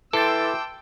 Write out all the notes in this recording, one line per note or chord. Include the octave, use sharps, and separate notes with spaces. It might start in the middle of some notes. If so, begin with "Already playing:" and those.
E3 A4 G5 A5 C6 D6 E6